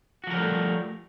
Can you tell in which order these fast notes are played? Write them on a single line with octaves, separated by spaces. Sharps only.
F#4 F3 A#4 G3 A3